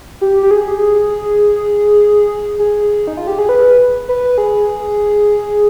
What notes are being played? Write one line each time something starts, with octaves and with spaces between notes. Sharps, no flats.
G4
G4
G#4
G#4
D#4
F4
G4
G#4
B4
B4
G#4